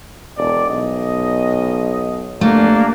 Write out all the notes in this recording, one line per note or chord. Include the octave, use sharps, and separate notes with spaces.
E1 D5
B1 D#5
G1 A3 A#3 D4